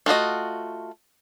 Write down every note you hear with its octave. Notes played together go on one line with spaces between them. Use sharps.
A3 F4 F#4 D#5